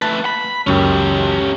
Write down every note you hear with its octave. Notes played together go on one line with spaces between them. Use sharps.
A3 B4 A5
B5
C#2 F#2 C#4 G4